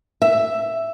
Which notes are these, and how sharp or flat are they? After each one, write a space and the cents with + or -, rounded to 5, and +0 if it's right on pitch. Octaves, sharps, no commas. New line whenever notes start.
E5 +5